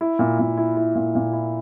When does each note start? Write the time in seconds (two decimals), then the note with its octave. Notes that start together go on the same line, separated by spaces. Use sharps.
0.01 E4
0.19 A#2
0.39 A#2
0.58 E4
0.77 E4
0.95 A#2
1.15 A#2
1.33 E4